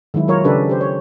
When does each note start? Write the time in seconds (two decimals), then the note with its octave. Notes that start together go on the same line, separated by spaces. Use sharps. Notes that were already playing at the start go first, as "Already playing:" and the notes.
0.14 D#3 F#3 G#3 E4
0.28 F#3 F4 A#4 C#5
0.44 C#3 C#4 D4 G4 A4 B4
0.69 G4 C5
0.81 C#5